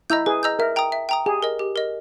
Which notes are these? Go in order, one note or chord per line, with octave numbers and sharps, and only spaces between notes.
E4 D#5 A#5 E6 G6
G#4 B4
D#5 A#5 E6 G6
A#4 E5
G5 A#5 D#6
E5
G5 A#5 D#6
G4 G#4
A#4 D#5
G4
A#4 D#5